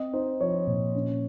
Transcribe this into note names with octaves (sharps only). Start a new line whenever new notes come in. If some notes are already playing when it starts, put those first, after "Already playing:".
Already playing: C4 D#5
D#4 C5
F3 C#5
A#2
C#4